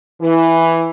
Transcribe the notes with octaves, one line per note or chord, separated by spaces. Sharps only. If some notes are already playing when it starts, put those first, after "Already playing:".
E3